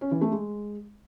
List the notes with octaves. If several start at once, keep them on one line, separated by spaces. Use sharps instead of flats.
C#4
E3
A3
G#3